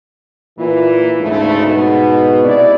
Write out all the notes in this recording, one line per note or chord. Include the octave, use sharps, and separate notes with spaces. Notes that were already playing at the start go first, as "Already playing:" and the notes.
A#2 E3 A#3
D2 G#2 C#3 A3
B2
C3 E4 D5